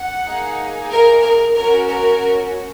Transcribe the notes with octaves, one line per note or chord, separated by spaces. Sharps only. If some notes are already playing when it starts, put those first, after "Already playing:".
Already playing: F#5
A#3 D#4 G#4
A#4
A#4
C#4 F#4 A#4
A#4